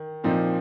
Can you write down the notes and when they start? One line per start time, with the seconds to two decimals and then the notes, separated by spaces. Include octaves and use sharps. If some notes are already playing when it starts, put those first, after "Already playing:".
Already playing: D#3
0.24 A#2 F3 C4 D#4